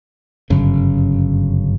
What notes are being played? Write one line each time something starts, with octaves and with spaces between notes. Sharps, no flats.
G1 F#2 C#3